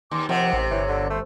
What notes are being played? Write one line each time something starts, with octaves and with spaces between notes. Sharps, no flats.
D#2 D6
D#2 C3 F3 F#5
A1
G1 E3 C#5
D3
A3 C5